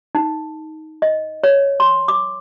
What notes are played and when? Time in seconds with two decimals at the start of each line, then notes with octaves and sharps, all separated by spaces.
0.15 D#4
1.02 D#5
1.44 C#5
1.80 C6
2.08 D6